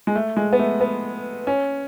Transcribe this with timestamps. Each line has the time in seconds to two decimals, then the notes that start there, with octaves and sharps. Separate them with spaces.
0.07 G#3
0.15 A3
0.37 G#3
0.53 B3
0.59 A3
0.81 B3
1.47 C#4